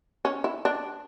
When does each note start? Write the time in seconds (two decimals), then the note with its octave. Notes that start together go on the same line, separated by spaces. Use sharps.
0.25 C#4
0.44 E4
0.65 D4